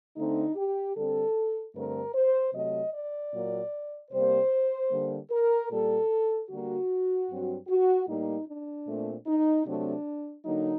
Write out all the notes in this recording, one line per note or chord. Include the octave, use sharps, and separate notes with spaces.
D3 A3 C4 D#4
G4
D3 G3 C4 A4
G2 D3 A3 C4 A#4
C5
C3 F#3 A3 D#5
D5
A#2 F#3 A#3
C3 G3 A#3 C5
D3 G3 A#3
A#4
A#2 G3 A#3 A4
D3 G3 A#3 F#4
G2 F#3 C4
F#4
A2 G3 A#3 D#4
D4
A#2 A3 C4
D#4
C3 F#3 A3 C4 D4
D3 F#3 A#3 D#4